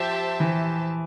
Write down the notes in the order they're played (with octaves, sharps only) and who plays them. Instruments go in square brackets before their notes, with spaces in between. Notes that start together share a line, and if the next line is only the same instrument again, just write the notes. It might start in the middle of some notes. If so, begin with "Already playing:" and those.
Already playing: [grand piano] F3 [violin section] G4 C5 E5 A5
[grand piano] E3